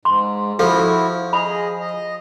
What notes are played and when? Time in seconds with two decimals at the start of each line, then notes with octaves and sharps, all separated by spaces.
0.05 G#2 C6
0.59 F3 E4 F#4 A4
1.33 G#4 D#5 B5
1.80 D#5